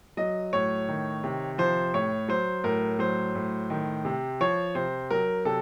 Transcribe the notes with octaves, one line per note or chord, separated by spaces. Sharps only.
F#3 D#5
A2 C#5
D#3
C3
F3 C5
A2 C#5
F#3 C5
A2 A#4
F#3 C5
A2
D#3
C3
F3 C#5
C3 C5
F#3 A#4
C3 A4